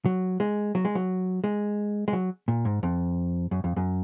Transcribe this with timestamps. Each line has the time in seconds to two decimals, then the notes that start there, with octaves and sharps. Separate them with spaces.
0.06 F#3
0.40 G#3
0.75 F#3
0.85 G#3
0.95 F#3
1.44 G#3
2.08 G#3
2.13 F#3
2.48 A#2
2.65 G#2
2.83 F2
3.51 F#2
3.64 F2
3.76 F#2